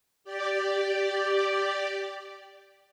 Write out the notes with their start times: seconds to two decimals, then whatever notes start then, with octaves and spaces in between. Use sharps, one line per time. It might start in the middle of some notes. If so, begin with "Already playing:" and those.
0.24 G4 D5